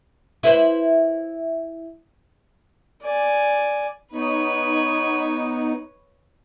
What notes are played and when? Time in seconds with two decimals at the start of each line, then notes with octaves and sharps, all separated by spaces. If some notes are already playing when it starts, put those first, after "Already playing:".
0.43 E4 B4 C5
3.02 D5 G#5
4.13 B3 D#4 B4 C#5